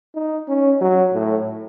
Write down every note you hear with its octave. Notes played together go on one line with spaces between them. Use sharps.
D#4
C#4
F#3
A2